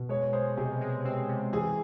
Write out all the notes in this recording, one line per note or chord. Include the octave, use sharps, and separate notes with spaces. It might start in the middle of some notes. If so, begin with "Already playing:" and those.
Already playing: B2
G#3 C#5
G#3 C5
C3 G#4
G#3
C4
C3
E3 G#4